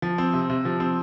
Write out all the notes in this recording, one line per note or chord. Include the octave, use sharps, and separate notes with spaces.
F3
C4
C3
C3
F3
C4